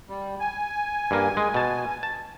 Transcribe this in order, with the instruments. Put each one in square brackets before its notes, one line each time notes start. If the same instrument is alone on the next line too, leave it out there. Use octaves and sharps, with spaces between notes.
[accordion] G3
G#5
[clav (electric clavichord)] G2 A#3
G#3
B2 A5
A5